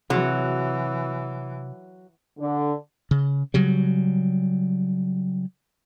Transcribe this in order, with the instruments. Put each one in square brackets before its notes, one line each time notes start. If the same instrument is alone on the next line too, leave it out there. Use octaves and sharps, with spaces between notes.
[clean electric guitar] C3 [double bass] E3 [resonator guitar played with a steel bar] F#3 [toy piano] F#4 G#4
[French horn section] D3
[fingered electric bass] C#3
C#3 F#3 G3